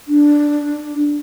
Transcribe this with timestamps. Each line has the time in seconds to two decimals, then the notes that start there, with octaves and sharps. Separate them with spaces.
0.08 D4